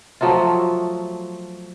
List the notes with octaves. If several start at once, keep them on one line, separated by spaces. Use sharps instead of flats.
F3 F#3 A3 F4